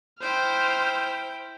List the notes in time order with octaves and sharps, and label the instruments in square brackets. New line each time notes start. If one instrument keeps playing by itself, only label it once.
[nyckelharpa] E4 G5 [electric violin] C5 F6